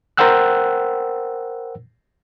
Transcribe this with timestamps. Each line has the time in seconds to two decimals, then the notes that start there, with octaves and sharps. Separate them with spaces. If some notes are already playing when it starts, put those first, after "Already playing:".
0.17 A#4 C5 F#5 G5 E6 F#6